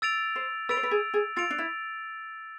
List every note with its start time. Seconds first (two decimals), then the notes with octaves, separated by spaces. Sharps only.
0.02 E6 A6 D7 F7
0.36 C5
0.69 B4 E6 A6 D7 F7
0.77 C5
0.83 B4
0.91 G#4
1.14 G#4
1.36 F4 E6 A6 D7 F7
1.50 D4
1.58 E4